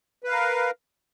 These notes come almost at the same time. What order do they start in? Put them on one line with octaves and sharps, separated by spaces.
B4 F5 A#4